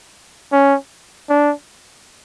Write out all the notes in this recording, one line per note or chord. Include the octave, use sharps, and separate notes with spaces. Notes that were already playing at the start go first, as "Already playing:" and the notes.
C#4
D4